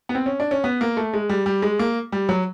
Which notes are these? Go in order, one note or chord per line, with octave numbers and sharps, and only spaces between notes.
B3
C4
C#4
D4
C#4
B3
A#3
A3
G#3
G3
G3
G#3
A#3
G3
F#3